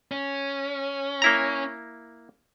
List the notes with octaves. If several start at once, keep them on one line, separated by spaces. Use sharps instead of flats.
C#4
A#3 E4 A#5